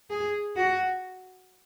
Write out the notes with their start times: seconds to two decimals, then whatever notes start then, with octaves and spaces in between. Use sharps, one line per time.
0.10 G#4
0.56 F#4